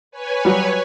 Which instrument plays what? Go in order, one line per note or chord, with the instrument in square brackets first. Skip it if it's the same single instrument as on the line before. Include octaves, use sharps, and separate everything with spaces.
[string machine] B4 C#5 G#5
[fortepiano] F#3 G3